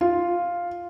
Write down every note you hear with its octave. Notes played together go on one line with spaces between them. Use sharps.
F4